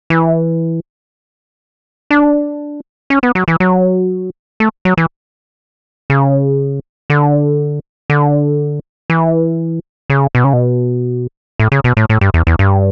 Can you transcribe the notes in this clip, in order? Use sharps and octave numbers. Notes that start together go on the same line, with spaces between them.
E3
D4
C#4
B3
F#3
E3
F#3
A3
F#3
E3
C#3
D3
D3
E3
C#3
B2
C#3
B2
A2
C#3
B2
A2
A2
G2
E2
E2
G2